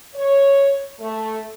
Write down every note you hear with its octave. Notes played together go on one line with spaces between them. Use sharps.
C#5
A3